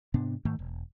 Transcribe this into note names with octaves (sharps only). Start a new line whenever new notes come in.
G#2 C3 B3 D4
G#2 D#3 A3
E1